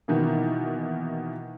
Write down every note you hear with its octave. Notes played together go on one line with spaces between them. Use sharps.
B2 D#3 E3 A#3